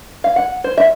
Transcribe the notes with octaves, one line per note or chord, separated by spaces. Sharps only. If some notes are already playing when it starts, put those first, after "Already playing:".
F5
F#5
C5
E5